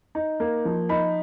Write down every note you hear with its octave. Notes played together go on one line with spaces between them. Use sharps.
D#4
A#3
F3
D#4 B5